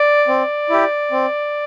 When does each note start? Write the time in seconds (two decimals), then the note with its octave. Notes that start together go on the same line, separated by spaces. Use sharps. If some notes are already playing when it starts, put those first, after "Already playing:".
Already playing: D5
0.28 C4
0.70 E4 G4
1.11 C4